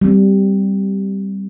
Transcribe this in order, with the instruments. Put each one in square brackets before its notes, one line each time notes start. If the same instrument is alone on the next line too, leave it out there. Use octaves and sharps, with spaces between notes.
[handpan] G3 C4